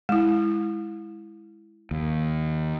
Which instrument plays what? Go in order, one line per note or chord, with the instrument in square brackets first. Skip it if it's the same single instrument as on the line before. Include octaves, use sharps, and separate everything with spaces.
[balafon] G#3 E4
[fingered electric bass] D#2